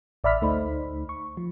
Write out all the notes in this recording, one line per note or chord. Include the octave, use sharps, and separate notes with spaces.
A1 D5 E5 B5 F6 B6
D2 A3 D#4 C5 B5
C#6
F3